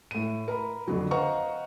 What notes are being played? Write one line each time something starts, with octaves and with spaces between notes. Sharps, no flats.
A2 D#7
A#4 A#5 B5
F2 D3 F#3
C5 D#5 F5 F#5 A#5 C#6